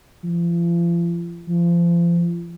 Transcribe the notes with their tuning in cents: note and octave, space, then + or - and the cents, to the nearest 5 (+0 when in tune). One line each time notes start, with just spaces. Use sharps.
F3 -40
F3 -30